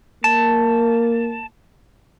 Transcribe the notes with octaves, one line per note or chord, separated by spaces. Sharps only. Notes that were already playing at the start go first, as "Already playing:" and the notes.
A#3 A5